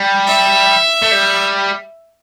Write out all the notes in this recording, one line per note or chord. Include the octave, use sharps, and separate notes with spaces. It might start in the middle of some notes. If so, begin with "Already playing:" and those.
Already playing: G3
E5
A3
G3